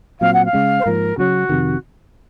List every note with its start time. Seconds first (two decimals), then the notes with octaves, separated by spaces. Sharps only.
0.20 A#2 F#3 C4 F5
0.32 F#5
0.45 F5
0.53 C#3 G#3 C#4
0.79 C5
0.86 G#2 F3 A#3 A#4
1.17 C#3 F#3 C#4 F#4
1.49 F2 C3 D#3